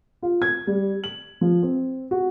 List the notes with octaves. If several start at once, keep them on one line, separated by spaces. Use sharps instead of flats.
F4
G#6
G3
F#7
F3
C4
F#4